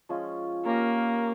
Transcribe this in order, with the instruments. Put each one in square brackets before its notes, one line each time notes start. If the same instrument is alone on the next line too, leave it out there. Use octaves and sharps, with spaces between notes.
[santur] F3 G#3 C#4 G#4
[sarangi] A#3 [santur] C#4 G4 A#4